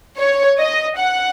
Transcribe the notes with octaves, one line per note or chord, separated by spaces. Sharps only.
C#5
D#5
F#5